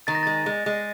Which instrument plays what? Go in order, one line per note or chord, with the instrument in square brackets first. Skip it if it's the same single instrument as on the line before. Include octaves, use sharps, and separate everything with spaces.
[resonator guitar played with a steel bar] D#3 [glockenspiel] A6
[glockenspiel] A#6
[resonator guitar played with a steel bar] G#3 [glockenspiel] A6
[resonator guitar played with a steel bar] G#3
G#3